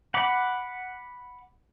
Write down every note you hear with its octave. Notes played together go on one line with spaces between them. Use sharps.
F#5 B5 D6